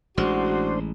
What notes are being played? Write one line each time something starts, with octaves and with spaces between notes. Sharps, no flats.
A1 G#3 D4 F#4 C5